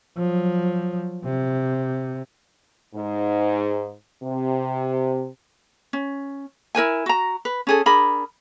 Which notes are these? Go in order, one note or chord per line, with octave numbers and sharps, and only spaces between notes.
F3 F#3
C3
G#2
C3
C#4
E4 A#4 C5 G#5
F#4 A#5
B4
C#4 G#4 A4
D4 G#4 A#4 B5